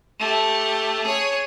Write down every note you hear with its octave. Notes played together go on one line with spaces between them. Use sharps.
A3 G4
G#4 C#5